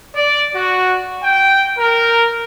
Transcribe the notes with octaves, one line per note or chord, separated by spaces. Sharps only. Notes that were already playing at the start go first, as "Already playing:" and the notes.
D5
F#4
G5
A#4